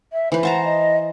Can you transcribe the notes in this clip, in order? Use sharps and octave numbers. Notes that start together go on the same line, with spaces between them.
E5
E3 B4 C5
C5 F#5 A5 A#5
D#5